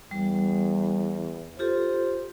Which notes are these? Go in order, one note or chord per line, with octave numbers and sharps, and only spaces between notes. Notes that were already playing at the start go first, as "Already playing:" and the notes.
E2 G3
F4 G4 A4 C5